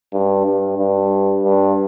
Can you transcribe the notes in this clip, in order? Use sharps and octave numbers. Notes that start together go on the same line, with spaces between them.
G2
G2
G2
G2